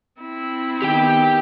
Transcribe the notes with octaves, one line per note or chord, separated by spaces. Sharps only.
C4 E4
D#3 B3 G4 G5